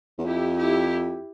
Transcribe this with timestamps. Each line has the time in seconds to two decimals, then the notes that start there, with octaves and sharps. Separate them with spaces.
0.18 E2
0.24 F2 E4 G4
0.57 E4 G4